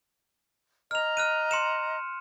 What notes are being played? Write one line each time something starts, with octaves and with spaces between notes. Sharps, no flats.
D#5 A#5 F6 F7
F6 F#6 D#7
C6 C#7 E7